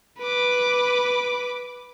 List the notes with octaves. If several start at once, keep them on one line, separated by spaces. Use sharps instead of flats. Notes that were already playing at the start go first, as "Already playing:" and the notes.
B4 D6